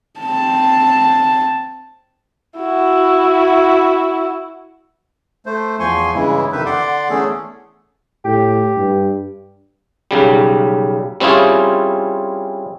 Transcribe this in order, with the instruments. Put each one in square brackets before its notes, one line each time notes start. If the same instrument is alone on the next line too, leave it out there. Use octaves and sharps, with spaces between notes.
[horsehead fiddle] C4 A5
[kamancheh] E4 F#4
[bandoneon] A3 C5
E2 F3 G#5 C6 C#6
G2 C#3 E3 G#3 E4
F2 C3 D#3 D#4 B4 E5
D3 D5 F#5 C6 D6
E3 A3 B3 C#4 G#4 A4
[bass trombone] A2 [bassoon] G4
[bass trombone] G2
[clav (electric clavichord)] B1 C#3 G3
G3 C4 C#4 E4 F4 G#4